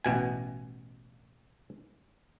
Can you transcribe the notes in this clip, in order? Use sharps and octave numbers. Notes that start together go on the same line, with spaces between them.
A1 B2 G#5